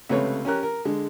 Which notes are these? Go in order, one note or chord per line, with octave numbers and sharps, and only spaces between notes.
C#2 C3 A3 B4 C#5
C#4 G4 A#4 F#6
A#4
D3 G#3